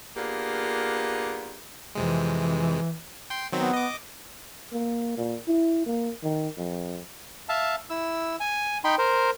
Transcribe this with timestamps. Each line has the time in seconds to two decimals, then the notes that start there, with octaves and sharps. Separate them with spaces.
0.17 A#3 B3 D4 F4 G4 G#4
1.95 F2 C3 E3 G#3
3.30 G5 C6
3.52 D#3 F#3 B3 C4
3.73 D#5 D6
4.73 A#3
5.17 A#2
5.48 E4
5.86 A#3
6.23 D#3
6.57 F2
7.49 E5 F5 A5
7.90 E4 E6
8.40 G#5
8.84 D#4 G5 B5 C6
8.98 A#4 C5